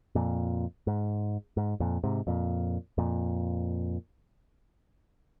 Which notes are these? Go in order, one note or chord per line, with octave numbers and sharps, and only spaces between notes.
F2 A#2
G#2
G#2
F2 A#2
G#2 C3
F2 A#2
F2 A#2